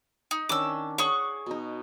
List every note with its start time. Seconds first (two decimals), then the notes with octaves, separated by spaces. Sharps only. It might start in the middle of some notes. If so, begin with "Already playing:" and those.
0.31 D#4
0.49 D#3 C#4 D4 D6 E6
0.98 G#4 C#5 D5 F#5 C#6
1.46 B2 D#4